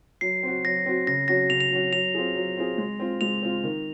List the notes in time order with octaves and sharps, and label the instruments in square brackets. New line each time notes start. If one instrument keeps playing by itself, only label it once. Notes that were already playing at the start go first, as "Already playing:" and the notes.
[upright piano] F#3 [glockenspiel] C7
[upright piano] C4 F#4
[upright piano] F#3 [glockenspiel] A#6
[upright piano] C4 F#4
[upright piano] C#3 [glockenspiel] A#6
[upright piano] F#3 C#4 F#4 [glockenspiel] A#6
[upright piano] C#3 [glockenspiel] F7
[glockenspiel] F7
[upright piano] F#3 C#4 F#4
[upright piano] F#3 [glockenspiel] F7
[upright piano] C4 F4 G#4
F#3
C4 F4 G#4
G#3
C4 F4
[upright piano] G#3 [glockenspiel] F7
[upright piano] C4 F4
D#3